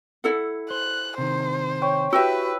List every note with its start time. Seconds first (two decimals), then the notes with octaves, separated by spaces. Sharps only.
0.24 E4 A4 F#5
0.71 C5 F#6
1.18 C3 D#3 C5
1.82 C#5 G5
2.13 E4 F#4 G4 B4 E5 E6